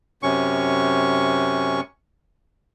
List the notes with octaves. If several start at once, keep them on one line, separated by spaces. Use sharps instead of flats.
F#2 C3 C#4 C#6